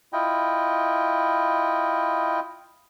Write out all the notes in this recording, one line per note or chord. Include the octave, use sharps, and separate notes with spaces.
E4 F4 D#5 G5